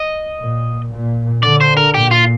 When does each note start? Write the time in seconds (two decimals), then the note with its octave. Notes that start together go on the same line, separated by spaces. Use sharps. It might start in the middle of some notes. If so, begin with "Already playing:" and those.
Already playing: D#5
0.40 A#2
0.92 A#2
1.43 D3 D5
1.61 C5
1.77 A#4
1.94 A#2 G4
2.11 F4